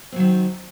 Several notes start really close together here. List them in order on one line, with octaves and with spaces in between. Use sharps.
C4 F#3 D#3